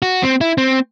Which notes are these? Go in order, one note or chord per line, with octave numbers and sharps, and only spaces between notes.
F#4
C4
E4
C4